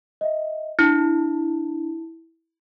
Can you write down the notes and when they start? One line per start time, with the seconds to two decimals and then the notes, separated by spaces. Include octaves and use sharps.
0.21 D#5 E5
0.79 D4 E4